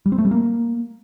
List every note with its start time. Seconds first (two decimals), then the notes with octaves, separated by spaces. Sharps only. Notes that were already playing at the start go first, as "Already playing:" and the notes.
0.06 G3
0.12 C4
0.18 A3
0.25 G3
0.31 A#3